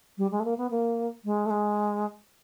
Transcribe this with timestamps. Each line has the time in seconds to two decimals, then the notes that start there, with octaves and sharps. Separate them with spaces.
0.18 G3
0.31 G#3
0.40 A3
0.45 A#3
0.58 B3
0.71 A#3
1.25 G#3
1.46 A3
1.50 G#3